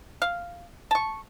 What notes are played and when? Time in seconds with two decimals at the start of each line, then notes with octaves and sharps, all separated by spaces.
0.22 F5
0.91 A5 C#6